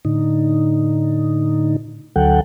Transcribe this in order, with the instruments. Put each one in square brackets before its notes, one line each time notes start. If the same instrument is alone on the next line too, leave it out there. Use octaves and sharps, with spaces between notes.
[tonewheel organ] A2 D3 D#4
D2 D3 F#3 A4 F#5 G5